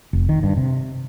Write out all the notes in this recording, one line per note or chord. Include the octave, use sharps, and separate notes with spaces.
F1
D#3
G2
C3